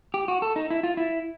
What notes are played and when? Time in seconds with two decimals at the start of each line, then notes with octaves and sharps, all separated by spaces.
0.14 G4
0.28 F#4
0.42 A4
0.56 D#4
0.70 E4
0.83 F4
0.97 E4